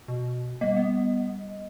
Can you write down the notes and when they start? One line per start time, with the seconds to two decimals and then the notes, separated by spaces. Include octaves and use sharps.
0.08 B2
0.61 G3 A#3 D#5
0.77 B3